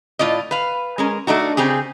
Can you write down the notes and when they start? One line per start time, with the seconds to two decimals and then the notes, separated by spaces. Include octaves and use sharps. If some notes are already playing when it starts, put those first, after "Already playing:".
0.19 A2 F4 D5 D#5
0.51 B4 F5
0.98 G#3 C#4 A#4
1.27 A3 D4 D#4 F#4
1.57 C#3 C4 G4 G#4